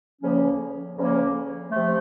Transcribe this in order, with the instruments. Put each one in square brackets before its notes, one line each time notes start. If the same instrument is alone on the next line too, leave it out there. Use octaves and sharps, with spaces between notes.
[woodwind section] D2 C#3 F3 A#3 C#4
D2 C#3 F3 A#3 C#4
C3 F3 A3